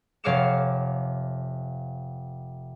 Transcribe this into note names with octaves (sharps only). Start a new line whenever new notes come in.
F1 C#5 F5 D6 C#7 E7